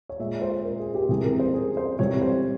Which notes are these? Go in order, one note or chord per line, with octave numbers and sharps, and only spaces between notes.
C#5
A#2 G#3 E5
C5
A#4
G#4
G4
C3 E3 G3 G#4
A#4
C5
G#4
C5
C3 E3 G3 C#5
C5